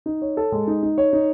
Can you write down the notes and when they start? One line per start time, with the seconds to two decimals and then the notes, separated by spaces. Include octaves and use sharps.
0.06 D#4
0.22 C#5
0.37 A4
0.52 G#3
0.67 D#4
0.83 D#4
0.98 C#5
1.13 D#4